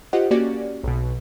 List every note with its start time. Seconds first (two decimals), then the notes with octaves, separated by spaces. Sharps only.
0.13 F4 G4 C5 D#5 F#5
0.31 A#3 C#4 F#4 G4 D5
0.84 B1 B2